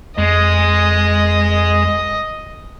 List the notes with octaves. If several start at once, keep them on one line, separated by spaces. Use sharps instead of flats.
F2 G#3 D#5